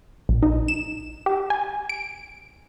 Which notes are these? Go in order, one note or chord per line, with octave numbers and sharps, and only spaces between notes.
A#1
D#4
E7
G4
G#5
D7